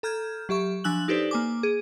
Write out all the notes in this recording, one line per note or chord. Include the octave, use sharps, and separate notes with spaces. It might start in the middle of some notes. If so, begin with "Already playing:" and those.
A4 A#5 F6 G6 G#6
F#3 G4 E5 C#6
F3 D4 G#5 E6 F#6 F#7
D#4 G4 A4 B4 C5 D5
A#3 G#5 D6
G#4